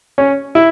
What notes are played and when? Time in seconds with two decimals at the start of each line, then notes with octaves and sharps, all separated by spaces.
0.18 C#4
0.55 E4